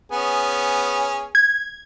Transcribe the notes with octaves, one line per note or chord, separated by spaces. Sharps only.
B3 C#4 G#4
G#6